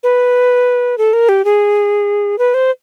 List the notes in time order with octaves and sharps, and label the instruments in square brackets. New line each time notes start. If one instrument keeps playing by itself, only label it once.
[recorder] B4
A4
A#4
G4
G#4
B4
C5